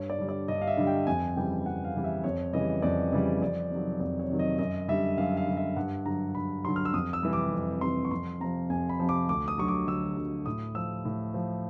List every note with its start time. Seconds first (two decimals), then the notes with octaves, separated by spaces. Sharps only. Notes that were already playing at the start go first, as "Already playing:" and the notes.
Already playing: G2 C#5
0.10 D5
0.19 D3 G3
0.29 D5
0.48 G2 D#5
0.62 F5
0.67 E5
0.77 D3 G3
0.87 G5
1.07 F2 G#5
1.36 C#3 E3 G3 G5
1.66 F2 F#5
1.85 F5
1.95 C#3 E3 G3
2.04 E5
2.24 F2 C#5
2.53 C#3 E3 G3 D#5
2.82 F2 D5
3.13 C#3 E3 G3
3.41 F2 D5
3.71 C3 D#3 F#3
4.00 F2 D5
4.19 C#5
4.30 C3 D#3 F#3
4.39 D#5
4.59 F#2 D#5
4.88 D3 G3 E5
5.18 F#2 F5
5.37 F5
5.47 D3 G3
5.57 E5
5.76 G2 F#5
6.05 D3 F#3 A#5
6.35 G2 B5
6.65 D3 F#3 C6
6.76 F6
6.85 E6
6.93 F2 D#6
7.13 E6
7.23 C3 E3 G3
7.33 D6
7.52 F2
7.81 C3 E3 G3 C6
8.05 C#6
8.11 F2 C6
8.41 C3 F3 A#5
8.70 F2 G#5
8.89 B5
8.99 C3 F3
9.09 D6
9.29 D2 D6
9.48 D#6
9.58 D3 F#3 C#6
9.68 D6
9.87 D2 E6
10.17 D3 F#3
10.46 A2 D#6
10.75 F3 E6
11.05 A2
11.34 F3